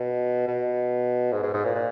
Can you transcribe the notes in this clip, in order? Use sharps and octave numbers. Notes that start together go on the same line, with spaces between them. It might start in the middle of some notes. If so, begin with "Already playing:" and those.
Already playing: B2
B2
G#2
G#2
G#2
A#2
A#2